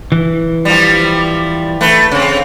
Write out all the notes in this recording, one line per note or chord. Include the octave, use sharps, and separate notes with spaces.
E3
F3 G3
A3 B4
C#3 C4